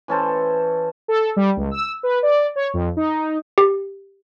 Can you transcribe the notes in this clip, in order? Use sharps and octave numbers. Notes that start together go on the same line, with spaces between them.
E3 C#4 A4 C5
A4
G3
C#2
E6
B4
D5
C#5
F2
D#4
G4